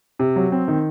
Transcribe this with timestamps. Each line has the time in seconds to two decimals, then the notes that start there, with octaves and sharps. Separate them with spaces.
0.19 C3
0.36 F#3
0.52 C4
0.68 D#3